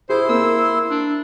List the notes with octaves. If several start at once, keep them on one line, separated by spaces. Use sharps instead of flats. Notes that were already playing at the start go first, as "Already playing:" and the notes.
E4 G#4 C5 C6
A#3 E6
D4